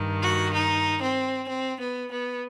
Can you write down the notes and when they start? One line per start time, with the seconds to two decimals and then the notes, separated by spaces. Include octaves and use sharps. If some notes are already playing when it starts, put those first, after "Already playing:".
Already playing: G2 D#3
0.22 F#4
0.53 D#4
1.01 C4
1.47 C4
1.79 B3
2.11 B3